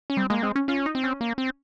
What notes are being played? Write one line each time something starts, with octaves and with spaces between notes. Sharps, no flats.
C#4
G3 C4
G#3 A#3
G#3 C4
C#4
C#4 F4
D#4
C4
C#4
A#3
C4